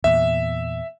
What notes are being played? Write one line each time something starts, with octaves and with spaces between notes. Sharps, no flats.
E2 A#2 E5